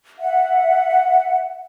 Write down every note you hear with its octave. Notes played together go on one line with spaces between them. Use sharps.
E5 F#5